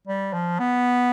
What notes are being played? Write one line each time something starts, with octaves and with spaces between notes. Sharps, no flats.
G3
F3
B3